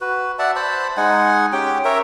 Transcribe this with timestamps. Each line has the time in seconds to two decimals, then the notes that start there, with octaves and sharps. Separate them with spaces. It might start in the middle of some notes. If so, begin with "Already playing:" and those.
0.01 F#4 B4
0.39 D5 E5 F#5 A5
0.56 C5 A5 B5
0.97 G#3 D#4 F#5 G#5
1.52 C#4 G4 G5
1.85 A#4 C#5 E5